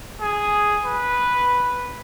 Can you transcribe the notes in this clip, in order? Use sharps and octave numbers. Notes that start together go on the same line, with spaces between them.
G#4
B4